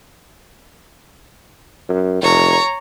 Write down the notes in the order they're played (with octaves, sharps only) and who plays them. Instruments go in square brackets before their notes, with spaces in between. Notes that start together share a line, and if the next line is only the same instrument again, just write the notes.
[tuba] F#2
[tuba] F1 [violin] C#5 A#5